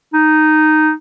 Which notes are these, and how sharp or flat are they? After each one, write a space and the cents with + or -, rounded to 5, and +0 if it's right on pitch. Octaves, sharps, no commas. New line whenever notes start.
D#4 -5